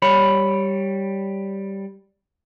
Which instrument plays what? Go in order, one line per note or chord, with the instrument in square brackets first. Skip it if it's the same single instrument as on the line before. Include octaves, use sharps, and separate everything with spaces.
[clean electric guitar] G3 C#5 B5